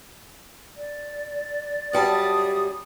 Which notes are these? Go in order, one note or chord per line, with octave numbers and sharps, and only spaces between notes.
D5
F#2 G3 A5 D#6